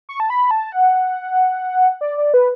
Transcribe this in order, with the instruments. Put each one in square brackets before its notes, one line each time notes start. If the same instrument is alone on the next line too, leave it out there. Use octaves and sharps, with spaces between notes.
[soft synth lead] C#6
A5
B5
A5
F#5
D5
D5
B4